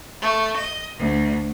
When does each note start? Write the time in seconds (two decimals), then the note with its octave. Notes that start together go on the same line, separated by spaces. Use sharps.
0.20 A3
0.55 D#5
0.97 D2